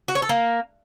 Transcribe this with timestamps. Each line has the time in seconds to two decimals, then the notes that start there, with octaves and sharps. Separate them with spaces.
0.08 F#4
0.15 C#5
0.22 A4
0.29 A#3